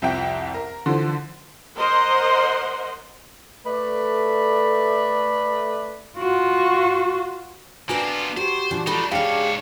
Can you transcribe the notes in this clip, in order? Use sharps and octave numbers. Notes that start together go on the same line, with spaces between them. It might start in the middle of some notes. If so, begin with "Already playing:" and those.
C2 F2 E5 F#5 G5
A#4
D3 E3 F3
A#4 C5 D#5 F#5 C6
A3 B4 D5
F4 F#4
A#3 C4 D4 F#4 A#4 B4 G#5
B3 F4
F#4 G4 A#4 C5
A#2 E3 F3 D4
F3 A3 D4 D#4 F4 B5
G#2 D4 G4 G#4 C#5 F5 F6